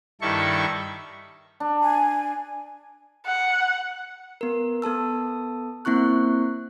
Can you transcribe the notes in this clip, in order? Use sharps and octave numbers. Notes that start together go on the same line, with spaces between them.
G2 D#3 E4 A4 C#6
D4
G#5
F#5
B3 A#4
B3 A4 A5 E6
A#3 C4 E4 C#6 F#6